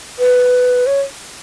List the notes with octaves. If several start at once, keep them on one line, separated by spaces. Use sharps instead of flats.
B4
C#5